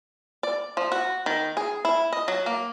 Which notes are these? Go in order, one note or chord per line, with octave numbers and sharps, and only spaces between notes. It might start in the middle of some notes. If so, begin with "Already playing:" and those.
D5
F3
F#4
D#3
G#4
E4
D#5
F#3
A#3